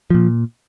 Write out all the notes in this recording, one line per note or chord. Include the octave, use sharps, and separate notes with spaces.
A#2 F3